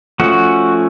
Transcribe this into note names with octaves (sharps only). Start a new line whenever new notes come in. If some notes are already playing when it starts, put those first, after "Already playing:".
F3 A3 C#4 F#4